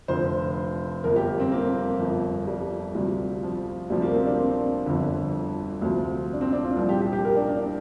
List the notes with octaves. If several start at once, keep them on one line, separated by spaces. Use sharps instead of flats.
F1 F2 D3 F3 C5
G1 F2 F3 A#4
G4
C4
A#3
G1 F2 F3
G3
D2 C3 F3 G3
F3
D2 C3 F3 G3
A#3
C4
D4
C4
G1 F2 D3
D2 C3 F3
D4
C4
D4
F4
C2 A#2 F3
G4
G4
G4
A#4
D4
D4